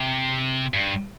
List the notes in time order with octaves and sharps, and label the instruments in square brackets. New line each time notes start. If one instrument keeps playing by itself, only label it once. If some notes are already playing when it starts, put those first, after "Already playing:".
Already playing: [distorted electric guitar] C3
G2